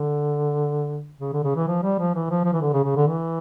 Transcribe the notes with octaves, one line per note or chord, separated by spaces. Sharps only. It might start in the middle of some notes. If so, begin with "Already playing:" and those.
Already playing: D3
C#3
D3
C#3
E3
F3
G3
F3
E3
F3
F3
E3
D3
C#3
C#3
D3
E3